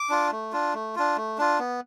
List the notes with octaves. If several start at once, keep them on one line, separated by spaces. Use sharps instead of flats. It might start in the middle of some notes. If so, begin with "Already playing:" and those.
Already playing: D6
D4 F4
A3
D4 F4
A3
D4 F4
A3
D4 F4
B3